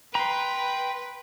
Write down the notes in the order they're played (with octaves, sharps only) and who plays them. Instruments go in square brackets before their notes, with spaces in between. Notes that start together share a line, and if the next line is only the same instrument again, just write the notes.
[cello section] B4 [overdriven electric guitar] G5 [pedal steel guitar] A#5 C6